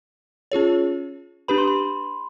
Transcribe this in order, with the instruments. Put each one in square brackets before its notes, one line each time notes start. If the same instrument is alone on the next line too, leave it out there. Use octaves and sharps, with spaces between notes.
[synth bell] C#4 F4 G#4 C#5
[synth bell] D4 G4 B4 [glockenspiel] B5
[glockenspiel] C6
B5